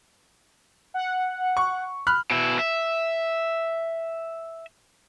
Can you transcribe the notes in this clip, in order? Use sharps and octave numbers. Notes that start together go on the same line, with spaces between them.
F#5
C#6
B5 F6 F#6
B2 E4
E5